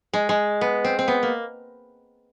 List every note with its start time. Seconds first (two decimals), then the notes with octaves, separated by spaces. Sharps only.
0.13 G#3
0.29 G#3
0.61 B3
0.84 C4
0.99 C4
1.08 B3
1.23 A#3